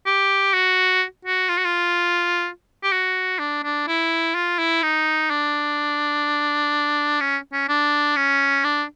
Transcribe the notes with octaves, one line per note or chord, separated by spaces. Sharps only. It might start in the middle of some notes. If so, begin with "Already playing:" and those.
G4
F#4
F#4
F4
F#4
F4
G4
F#4
D4
D4
E4
F4
E4
D#4
D4
C#4
C#4
D4
C#4
D4